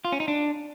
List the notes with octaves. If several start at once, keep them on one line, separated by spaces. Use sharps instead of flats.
F4
C#4
D#4
D4